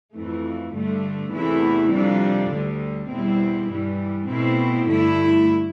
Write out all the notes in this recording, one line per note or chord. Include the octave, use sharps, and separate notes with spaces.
F2 E3 A3
G2 D3 A3
E2 C3 E3 A3 E4
F2 C3 G3 D4
D2 D3 G3
E2 B2 G3 C4 E4
G2 E3 G3
B2 A3 C4 E4
G2 D3 A3 E4